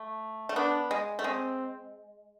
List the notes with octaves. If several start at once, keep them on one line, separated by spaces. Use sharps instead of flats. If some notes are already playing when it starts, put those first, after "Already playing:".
Already playing: A3
A3
B3 D4
G#3
A3
G#3 C4